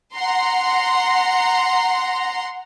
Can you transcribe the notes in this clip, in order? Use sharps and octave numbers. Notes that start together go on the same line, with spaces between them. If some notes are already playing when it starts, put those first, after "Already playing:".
F#5 A#5 C6